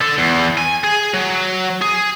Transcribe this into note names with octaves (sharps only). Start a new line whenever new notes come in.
D3 A4
E2
G#5
G#4
F#3
G#4